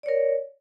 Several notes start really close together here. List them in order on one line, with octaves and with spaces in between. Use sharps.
D5 C#5 A#4